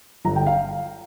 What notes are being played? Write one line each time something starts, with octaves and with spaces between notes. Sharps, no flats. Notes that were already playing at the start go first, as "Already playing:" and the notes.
G1 A#5
G5
F5